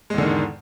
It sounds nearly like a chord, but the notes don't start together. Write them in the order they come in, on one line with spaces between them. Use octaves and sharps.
G#3 E2 D3 D#3 G#2